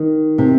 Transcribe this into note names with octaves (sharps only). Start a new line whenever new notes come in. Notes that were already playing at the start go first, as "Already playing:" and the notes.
Already playing: D#3
C3